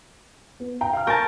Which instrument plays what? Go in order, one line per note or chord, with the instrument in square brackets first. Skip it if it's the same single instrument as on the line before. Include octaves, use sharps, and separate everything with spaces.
[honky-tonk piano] B3
G5 A#5
F5 F6
[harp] A#4 A5 [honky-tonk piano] G#5 C#6 G6